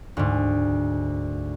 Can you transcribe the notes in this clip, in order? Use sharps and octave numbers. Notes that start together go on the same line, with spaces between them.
D2 G#2